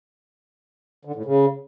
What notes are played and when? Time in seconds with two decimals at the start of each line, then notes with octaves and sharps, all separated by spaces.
1.05 D3
1.15 A2
1.25 C#3